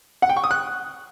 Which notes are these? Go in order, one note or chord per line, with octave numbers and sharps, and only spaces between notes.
F#5
G5
C#6
D#6
F#6